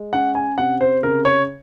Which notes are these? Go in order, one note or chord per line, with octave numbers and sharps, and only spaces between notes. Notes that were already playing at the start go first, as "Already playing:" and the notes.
Already playing: G#3
C#4 F#5
G#5
C3 F#5
C5
C#3 A#4
C#5